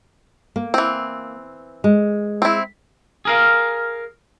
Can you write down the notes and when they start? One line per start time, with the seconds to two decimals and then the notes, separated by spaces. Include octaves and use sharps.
0.56 A#3
0.74 E3 C4
1.84 G#3
2.42 C4 E4
3.25 G#4 A#4 F5